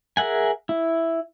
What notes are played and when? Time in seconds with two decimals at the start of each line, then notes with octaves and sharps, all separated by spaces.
0.17 G#4 A#4 E5 F#5 G#5
0.69 E4